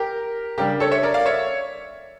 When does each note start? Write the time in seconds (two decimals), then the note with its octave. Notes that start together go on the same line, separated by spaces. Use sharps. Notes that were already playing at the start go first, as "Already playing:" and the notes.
Already playing: G4 A#4
0.58 C#3 G3 D4 G4 A#4
0.80 A4 C#5
0.91 C#5 E5
1.03 A#4 D5
1.14 D5 F5
1.26 C#5 E5